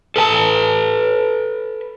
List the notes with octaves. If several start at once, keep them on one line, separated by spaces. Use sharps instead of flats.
A4 B4 G#5 A5